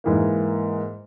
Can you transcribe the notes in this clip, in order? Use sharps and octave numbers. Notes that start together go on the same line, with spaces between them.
G#2 E3 A#3